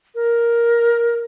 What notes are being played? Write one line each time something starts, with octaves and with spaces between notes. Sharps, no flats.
A#4